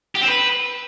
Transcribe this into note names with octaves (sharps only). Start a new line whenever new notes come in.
G4
C4
B4